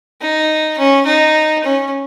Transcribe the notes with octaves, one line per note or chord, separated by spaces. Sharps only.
D#4
C#4
D#4
C#4